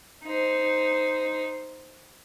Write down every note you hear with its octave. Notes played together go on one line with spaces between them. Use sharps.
D#4 C5